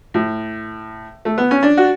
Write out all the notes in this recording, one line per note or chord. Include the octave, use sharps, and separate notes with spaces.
A2
A3
B3
C#4
D4
F#4